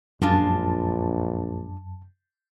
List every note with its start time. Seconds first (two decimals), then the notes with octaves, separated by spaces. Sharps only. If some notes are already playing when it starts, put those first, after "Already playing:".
0.22 A#1 F#2 G#3 D4 F4 A5